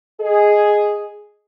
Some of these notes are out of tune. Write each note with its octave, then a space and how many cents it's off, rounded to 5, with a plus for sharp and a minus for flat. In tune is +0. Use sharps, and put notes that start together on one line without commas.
G#4 +0 D#5 +0